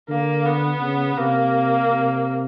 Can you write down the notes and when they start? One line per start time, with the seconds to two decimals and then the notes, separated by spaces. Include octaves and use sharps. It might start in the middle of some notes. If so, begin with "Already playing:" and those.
0.09 D3 A#3
0.45 B3
0.80 C#3
1.16 C3 A#3
1.88 C3